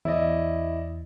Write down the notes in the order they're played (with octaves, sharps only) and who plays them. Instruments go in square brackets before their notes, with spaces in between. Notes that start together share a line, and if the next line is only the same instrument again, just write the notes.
[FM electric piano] E2 [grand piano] E4 D5 D#5